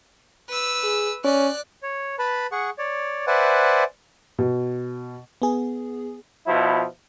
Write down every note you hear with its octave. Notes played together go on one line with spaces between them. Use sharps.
B4 E6
G#4
C#4 D5 F#6
C#5
B4 A5 B5
G#4 F#5 C#6
C#5 D5
B4 C5 D5 E5 F#5 G#5
B2
B3 G#4
B2 F3 E4